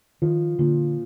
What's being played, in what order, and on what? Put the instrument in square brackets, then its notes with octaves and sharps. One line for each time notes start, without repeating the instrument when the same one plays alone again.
[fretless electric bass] D#3 [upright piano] F3
[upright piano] A#2 [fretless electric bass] D3